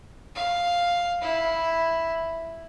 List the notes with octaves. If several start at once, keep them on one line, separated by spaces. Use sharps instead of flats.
F5
E4